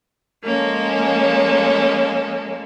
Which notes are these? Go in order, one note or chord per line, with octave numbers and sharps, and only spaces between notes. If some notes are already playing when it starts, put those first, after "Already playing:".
F3 G#3 A#3 C#4 A4